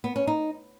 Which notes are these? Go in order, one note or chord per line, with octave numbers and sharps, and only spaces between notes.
B3
C#4
D#4